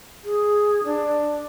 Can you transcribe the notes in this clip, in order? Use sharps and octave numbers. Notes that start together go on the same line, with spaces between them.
G#4
D4